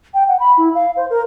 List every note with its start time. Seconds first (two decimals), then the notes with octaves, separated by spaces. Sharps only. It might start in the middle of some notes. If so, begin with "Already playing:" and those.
0.14 G5
0.28 F#5
0.40 B5
0.57 E4
0.75 F5
0.97 C5
1.10 A#4